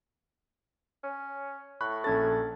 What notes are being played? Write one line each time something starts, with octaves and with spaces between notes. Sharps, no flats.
C#4
A2 B5 C#6 F#6
A#1 C#4 A4 A5 G#6 A6